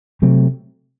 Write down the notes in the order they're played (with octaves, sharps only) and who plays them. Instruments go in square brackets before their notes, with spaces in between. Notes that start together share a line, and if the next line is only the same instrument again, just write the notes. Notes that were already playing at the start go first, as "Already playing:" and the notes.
[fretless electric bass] C3 F#3 A3 C4